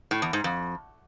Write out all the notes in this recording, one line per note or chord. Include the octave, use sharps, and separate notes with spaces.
A2
E2
G#2
F2